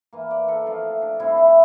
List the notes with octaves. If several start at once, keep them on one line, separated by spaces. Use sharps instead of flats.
E3 A#3
D5
A4
C3 F3 A3 F4
D4
C3 G3 C4 E4
E4